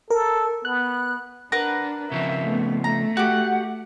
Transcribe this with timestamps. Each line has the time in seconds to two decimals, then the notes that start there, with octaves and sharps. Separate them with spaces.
0.10 A4 A#4
0.65 B3 F#6
1.52 D4 A#4 B4 F#5
2.12 C#3 F3 C4 E5
2.44 A3 B3
2.84 A3 A#5
3.17 F#4 G4 F#5